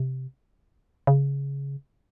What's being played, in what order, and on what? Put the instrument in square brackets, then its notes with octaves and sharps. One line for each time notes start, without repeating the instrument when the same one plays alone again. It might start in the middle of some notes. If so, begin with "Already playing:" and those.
Already playing: [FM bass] C3
C#3